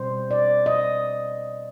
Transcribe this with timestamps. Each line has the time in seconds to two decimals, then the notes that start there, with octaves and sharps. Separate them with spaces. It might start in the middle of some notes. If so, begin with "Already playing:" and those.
Already playing: B2 G3 C4 C5
0.31 D5
0.66 D#5